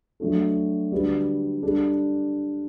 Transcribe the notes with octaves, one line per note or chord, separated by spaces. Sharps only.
F#3 A3 D4 F#4 A4
D3 G3 D4 F#4 B4
G3 D4 A4